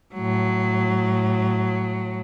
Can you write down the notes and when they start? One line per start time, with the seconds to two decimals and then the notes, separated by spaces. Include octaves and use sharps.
0.15 A2 F#3